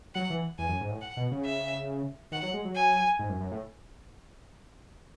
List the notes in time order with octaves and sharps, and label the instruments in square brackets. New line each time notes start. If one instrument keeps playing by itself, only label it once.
[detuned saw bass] F#3 [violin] F#5
[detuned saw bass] E3
[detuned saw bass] E2 [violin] G#5
[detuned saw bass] F#2
G#2
A2
[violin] F#5
[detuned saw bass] B2
C#3
[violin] E5
[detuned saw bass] D#3 [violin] F#5
[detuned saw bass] F#3
G#3
F#3
[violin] G#5
[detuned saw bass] G#2
F#2
F#2
A2